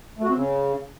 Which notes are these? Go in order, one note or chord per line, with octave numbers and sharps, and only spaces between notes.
A3
F#4
C4
C#3